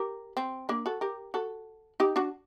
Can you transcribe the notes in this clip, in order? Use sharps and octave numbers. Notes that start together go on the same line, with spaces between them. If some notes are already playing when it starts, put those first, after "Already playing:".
Already playing: G4 A#4
C4
A#3 D4
F#4 A4
G4 A#4
F#4 A4
D#4 G4
D4 F#4